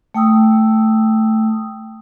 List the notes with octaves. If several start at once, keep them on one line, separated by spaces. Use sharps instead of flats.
A3 G5 D#6 E6